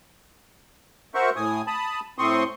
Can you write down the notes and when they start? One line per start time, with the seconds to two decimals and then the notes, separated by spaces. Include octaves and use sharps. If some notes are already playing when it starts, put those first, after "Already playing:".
1.15 F#4 A#4 C5 E5 C#6
1.36 A2 G#5 D#6
1.67 A5 B5 D#6
2.18 A2 C4 C6 C#6 D#6